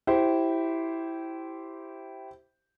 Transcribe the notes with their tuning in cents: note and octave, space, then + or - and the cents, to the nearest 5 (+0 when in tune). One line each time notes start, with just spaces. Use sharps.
E4 +0 G4 -15 C5 +0